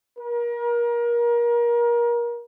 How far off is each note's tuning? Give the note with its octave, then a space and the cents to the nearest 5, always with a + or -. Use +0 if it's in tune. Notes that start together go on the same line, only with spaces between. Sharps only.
A#4 +30